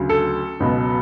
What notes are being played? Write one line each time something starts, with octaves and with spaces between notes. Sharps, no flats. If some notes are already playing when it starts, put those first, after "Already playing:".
Already playing: D2 C#3 F#3
A4
C#2 B2 F#3